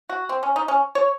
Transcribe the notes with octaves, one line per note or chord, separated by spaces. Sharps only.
F#4
C4
C#4
D#4
C#4
C#5